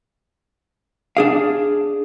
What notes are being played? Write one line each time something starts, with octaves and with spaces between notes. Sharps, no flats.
D4 G#4 F5